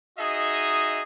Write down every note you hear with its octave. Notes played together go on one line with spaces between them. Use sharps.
D#4 F#4 G#4 D#5 E5